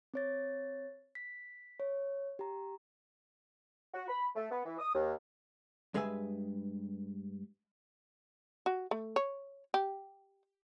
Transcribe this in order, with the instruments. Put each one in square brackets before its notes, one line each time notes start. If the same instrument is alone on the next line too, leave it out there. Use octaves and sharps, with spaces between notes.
[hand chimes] C4 C#5 A6
B6
C#5
G4 A#5
[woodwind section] F#4
B5
A3
B3
E3
D#6
D#2
[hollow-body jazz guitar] G2 G#3 G#4 B4 E5 G#5
[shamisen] F#4
A3
C#5
G4